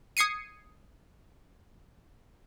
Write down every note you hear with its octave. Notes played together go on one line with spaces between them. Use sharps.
D#6 G#6 C7 C#7 D#7